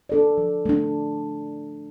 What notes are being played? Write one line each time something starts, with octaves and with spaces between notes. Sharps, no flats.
D4 A4 D5
F3
A3 D4